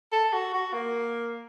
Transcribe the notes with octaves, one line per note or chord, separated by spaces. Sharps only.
A4
F#4
F#4
A#3